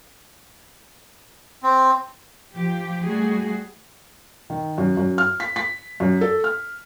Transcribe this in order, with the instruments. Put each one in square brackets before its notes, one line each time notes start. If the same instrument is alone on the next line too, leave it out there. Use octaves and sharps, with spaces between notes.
[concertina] C4
[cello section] F3 G4
G3 A3 F#4 G#4
[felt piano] D#3
F#2
F#2
F6
B6
B6
F#2
A4
F6